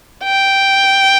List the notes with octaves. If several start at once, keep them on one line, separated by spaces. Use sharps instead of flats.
G5